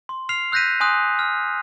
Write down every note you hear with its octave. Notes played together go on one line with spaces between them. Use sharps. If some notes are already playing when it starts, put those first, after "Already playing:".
C6
F6 C7 F7
E6 F#6 G6 A#6 B6 D#7
G#5 C6 D#6 F#6
F6